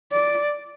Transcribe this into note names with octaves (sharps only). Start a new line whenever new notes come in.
D5